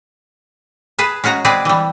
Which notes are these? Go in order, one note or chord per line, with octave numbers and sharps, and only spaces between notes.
G#4 B4 A5
G#3 C#4 F#4 A#5
G#3 C4 G#4 B4 D5
E3 G3